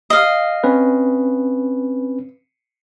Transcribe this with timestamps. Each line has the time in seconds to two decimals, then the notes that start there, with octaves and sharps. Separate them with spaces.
0.10 D#5 F5
0.64 C4 C#4 B4